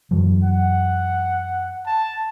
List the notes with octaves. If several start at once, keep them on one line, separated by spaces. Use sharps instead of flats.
F#2 E3 F#3
F#5
A5